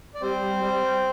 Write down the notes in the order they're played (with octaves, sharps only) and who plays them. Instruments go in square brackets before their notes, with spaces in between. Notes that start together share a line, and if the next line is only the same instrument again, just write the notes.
[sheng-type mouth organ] D5
[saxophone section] G3 [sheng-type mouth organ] C4 C5
[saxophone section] G3
G3
G3